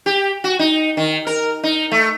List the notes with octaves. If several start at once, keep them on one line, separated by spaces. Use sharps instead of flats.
G4
F#4
D#4
D#3
A#4
D#4
A3